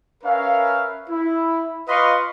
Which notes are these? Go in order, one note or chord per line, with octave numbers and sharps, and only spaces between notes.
C#4 A#4 B4 E5 F5
E4
F4 B4 D#5 F5 C6 C#6